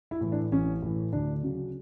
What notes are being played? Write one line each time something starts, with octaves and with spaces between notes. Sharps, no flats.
E4
A2 E3
D4
A1 C#4
A2 E3
D2 D4
C#3 F#3